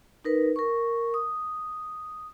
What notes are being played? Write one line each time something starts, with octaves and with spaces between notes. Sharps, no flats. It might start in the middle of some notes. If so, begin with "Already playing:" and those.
D#4 A#4 B4
A#4 C#6
D#6